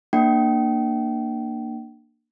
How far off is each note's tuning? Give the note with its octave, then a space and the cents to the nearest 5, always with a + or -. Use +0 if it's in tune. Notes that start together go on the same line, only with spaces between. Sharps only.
A#3 +0 D4 +25 G5 -35